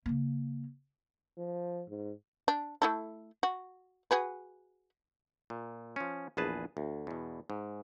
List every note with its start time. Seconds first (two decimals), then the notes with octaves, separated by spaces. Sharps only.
0.06 C#3 A#3
1.38 F3
1.89 G#2
2.48 D4
2.82 A3 E4 A4
3.43 F#4
4.11 F#4 G#4 B4
5.50 A#2
5.96 F3 C#4
6.37 A#1 E2 G#4 B4 A5
6.77 D2
7.07 E2 B2
7.50 G#2